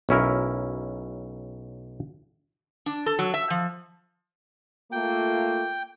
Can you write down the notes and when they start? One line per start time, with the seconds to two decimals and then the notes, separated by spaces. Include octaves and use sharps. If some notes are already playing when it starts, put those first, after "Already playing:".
0.09 B1 C#4 E4 A#4
2.86 D4
3.06 A4
3.19 F#3
3.34 E5
3.50 F3
4.92 A3 A#3 F4 G5